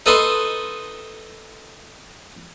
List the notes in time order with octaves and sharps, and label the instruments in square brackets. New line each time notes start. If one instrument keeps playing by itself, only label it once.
[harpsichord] D#4 A4 B4 D#5 E5 C6